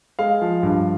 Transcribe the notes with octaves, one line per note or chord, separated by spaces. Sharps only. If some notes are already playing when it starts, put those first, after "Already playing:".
G#3 F5
F3
G2